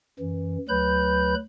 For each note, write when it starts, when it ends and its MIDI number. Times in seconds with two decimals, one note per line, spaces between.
0.19 0.58 42
0.19 0.58 52
0.69 1.34 38
0.69 1.34 54
0.69 1.34 71
0.69 1.34 83
0.69 1.34 91